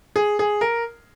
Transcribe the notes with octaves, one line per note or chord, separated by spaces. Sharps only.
G#4
G#4
A#4